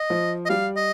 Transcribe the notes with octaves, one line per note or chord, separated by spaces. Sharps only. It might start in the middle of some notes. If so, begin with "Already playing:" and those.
Already playing: D#5
F3
D#5
G3 F5
D#5